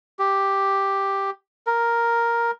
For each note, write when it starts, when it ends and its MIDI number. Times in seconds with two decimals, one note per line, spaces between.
0.19 1.30 67
1.67 2.51 70